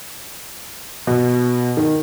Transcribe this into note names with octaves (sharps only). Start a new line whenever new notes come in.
B2
D#3